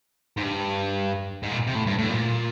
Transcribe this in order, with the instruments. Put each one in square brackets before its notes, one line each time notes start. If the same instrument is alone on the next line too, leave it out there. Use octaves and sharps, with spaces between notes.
[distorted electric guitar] G#2
G2
G#2
A#2
C3
A2
G2
A2
A#2